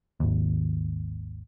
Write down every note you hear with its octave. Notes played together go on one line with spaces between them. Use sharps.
G#1 D#2